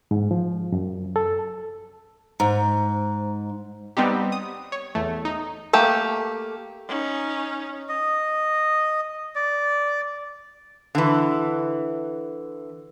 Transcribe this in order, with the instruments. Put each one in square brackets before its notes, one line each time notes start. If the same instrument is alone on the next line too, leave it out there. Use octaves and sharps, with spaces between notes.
[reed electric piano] G#2
F3
F#2
A4
[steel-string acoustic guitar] G#2 [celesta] C5 A#5
[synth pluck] G3 B3 C4 D#4 G4
D#6
C#5
E2 A3
D#4
[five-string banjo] A3 A#3 G4
[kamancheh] C#4 D#4
[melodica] D#5
D5
[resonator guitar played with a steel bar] D3 E3